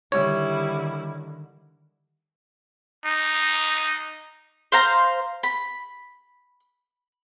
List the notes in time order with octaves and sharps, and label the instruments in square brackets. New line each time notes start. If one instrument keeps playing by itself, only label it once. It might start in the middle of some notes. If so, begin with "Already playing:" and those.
[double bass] D3 D#3 [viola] G3 E4 [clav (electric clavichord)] C#5
[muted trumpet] D#4
[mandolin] C5 F5 A#5
B5